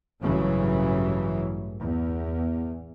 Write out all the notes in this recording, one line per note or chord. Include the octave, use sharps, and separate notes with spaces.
A1 G2 C#3 E3 F#3
E2